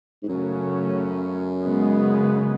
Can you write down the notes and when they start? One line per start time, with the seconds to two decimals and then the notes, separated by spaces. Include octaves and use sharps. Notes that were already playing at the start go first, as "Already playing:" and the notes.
0.23 G#2
0.28 F#2 C#3 F#3 A3 C#4
1.62 C#3 G#3 B3